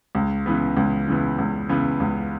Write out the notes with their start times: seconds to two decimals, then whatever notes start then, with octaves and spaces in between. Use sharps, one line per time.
0.15 C#2
0.46 C#3 E3 B3
0.77 C#2
1.07 C#3 E3 B3
1.38 C#2
1.69 C#3 E3 B3
2.00 C#2